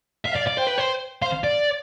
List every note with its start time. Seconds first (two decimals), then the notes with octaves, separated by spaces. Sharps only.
0.26 E5 F5
0.36 D5
0.48 D5
0.58 C5 G5
0.67 B4
0.78 C5
1.22 C5 F5
1.44 D5